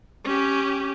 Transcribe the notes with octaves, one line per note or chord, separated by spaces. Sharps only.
C#4 G4